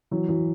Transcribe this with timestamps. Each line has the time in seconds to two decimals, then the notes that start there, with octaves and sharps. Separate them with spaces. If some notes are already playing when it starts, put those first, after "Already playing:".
0.11 E3 F#3
0.28 E3 F#3